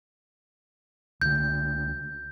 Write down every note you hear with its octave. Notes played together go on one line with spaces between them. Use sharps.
C#2 D3 G6